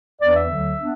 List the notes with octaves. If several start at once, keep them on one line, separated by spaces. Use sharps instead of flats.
E2 E3 B3 D4 D5
E5
D2 D3 F#3
B3 D4